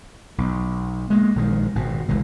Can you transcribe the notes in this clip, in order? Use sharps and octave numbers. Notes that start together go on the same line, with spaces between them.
B1
G#3 A#3
A#1 D#3 G#3
G#1 B2
F1 C#2 E3 G#3